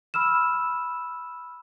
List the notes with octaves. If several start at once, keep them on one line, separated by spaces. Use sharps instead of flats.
B5 E6 F6 E7